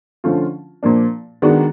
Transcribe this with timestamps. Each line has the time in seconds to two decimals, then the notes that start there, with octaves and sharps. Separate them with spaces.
0.24 D3 F3 A3 C#4 F4
0.83 A#2 F3 A#3 D4
1.42 D#3 G#3 B3 D4 F#4